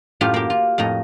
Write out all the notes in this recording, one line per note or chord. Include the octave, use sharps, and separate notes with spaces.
F#2 A2 F4 G4
A#3 G4
F4
F2 A2 D#5 A#5